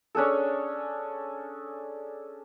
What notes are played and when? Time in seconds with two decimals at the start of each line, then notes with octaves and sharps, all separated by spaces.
0.15 C#4 D4 G#4 A4